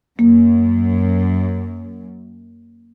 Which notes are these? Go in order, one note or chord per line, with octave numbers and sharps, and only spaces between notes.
F#2 A#3